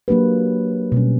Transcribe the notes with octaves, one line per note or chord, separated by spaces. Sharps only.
F#3 A#3 D4 G4 B4
B2 G3 C#4